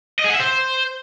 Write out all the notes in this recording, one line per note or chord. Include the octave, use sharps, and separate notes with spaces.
D#5
G#4
F#5
E5
C5